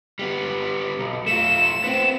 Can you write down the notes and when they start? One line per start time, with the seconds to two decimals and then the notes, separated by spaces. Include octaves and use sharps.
0.19 G3 B3
0.99 B1
1.27 A3 F4 E7
1.84 B3 C4